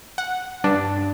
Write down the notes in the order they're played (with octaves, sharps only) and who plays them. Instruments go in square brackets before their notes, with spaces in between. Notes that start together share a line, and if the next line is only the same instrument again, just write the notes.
[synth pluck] F#5
[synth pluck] G2 [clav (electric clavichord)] D4